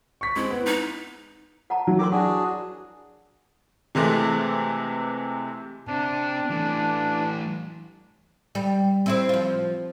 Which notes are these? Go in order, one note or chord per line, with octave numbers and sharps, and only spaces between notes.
C#6 B6
G#3 C4 E4
B3
D#4
F#5 A5 A#5
F#3
E4 G4 A#4 C6 D6
D4 F#4 G#4 F#5
C3 E3 G#3 A3
C3 D4
E3 A3
G3
C4 E4 C5
F3 F4